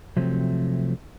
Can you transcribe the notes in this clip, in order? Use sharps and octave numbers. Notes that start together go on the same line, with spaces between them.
C3 F3 F#3 A3 C4